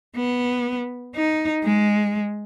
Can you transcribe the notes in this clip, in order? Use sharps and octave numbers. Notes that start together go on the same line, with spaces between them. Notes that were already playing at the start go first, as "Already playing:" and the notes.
B3
D#4
G#3